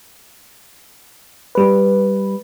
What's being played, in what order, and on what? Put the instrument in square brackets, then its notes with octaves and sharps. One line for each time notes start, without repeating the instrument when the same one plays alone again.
[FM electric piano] G3 B4